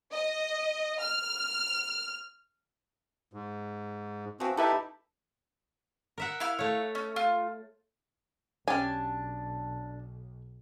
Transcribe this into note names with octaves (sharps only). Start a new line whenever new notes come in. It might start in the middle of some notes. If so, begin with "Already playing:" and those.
D#5
F6
G#2
E3 F3 C4 F#4
D#4 E4 G4 A4 B4 E5
A#4 E5 F#5
E4 F5 F6
A3 C#5
C#4
F4
B1 C#4 D4 G4 G#5 A5